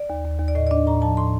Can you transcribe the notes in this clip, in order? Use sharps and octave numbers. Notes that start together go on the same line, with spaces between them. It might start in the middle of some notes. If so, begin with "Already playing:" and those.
Already playing: D5
D#2
D#2
D#2
D5
A2 D#5
D5
D4 D#5
A2 A#5
F3 A5
A2 C6